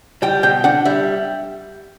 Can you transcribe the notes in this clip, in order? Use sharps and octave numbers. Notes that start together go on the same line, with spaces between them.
G3 G5
B2 G5
D4 F#5
G3 E5